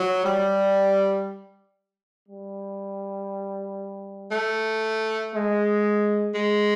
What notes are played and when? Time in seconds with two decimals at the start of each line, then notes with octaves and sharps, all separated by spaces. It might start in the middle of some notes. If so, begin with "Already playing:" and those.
Already playing: F#3
0.24 G3
2.28 G3
4.32 A3
5.33 G#3
6.35 G#3